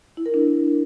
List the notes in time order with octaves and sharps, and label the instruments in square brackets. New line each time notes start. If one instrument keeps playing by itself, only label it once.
[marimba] E4
A#4
D4